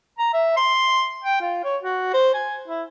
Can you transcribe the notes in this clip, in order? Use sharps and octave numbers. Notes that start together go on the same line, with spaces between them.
A#5
E5
C6
G5
F4
C#5
F#4
C5
G#5
E4